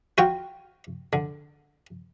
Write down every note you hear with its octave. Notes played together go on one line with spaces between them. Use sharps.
F4 F#4 C#5 G5
D3